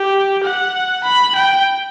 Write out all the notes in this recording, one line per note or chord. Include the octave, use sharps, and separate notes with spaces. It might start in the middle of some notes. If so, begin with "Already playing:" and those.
Already playing: G4
F#5
B5
G5